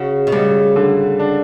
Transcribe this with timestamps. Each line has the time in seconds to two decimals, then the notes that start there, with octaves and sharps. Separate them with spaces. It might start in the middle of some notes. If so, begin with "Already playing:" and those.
Already playing: C#3 F#4
0.27 B2
0.32 C#3 G3
0.76 D3
1.19 D4